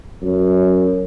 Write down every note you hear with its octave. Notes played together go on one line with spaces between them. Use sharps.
F#2